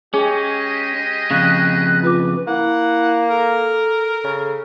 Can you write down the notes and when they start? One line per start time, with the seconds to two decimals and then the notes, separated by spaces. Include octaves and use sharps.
0.14 G#3 C#4 G4 G#4 D#5 G5
1.31 F2 G#2 C#3 F5 F#6
2.03 F4 B4 D6
2.47 A#3 E4 F#5
3.30 A4 A#4
4.24 C#3